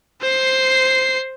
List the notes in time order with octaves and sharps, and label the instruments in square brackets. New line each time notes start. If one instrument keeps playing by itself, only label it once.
[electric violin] C5 C7